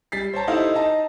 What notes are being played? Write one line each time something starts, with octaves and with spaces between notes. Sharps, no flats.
G3 A6 B6 C7
C5 C#5 A5 A#5
D#4 E4 G4 A4 C5 F5
D#4 D#5 A5 A#5